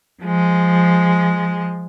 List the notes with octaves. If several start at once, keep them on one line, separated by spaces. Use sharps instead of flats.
F3 G#3